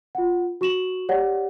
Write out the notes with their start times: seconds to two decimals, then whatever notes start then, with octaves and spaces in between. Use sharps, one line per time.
0.15 F4 F#5
0.61 F#4 C#6 E7 F#7
1.09 G4 C#5 D5 F#5